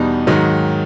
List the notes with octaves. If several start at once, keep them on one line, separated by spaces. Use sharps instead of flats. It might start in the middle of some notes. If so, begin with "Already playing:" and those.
Already playing: E2 B2 G3 B3 D#4
G#2 D#3 F#3